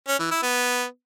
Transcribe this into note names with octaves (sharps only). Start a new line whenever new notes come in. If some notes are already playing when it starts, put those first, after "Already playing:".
C#4
E3
E4
B3